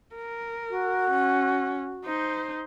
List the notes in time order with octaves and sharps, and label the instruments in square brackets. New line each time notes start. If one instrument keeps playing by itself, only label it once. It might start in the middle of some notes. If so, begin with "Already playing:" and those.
[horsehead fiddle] A#4
[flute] F#4
[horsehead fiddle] C#4
D#4 C5